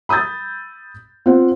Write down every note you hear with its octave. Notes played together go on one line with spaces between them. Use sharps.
B5 D#6 E6 G6 A6
C4 F4 C5 F#5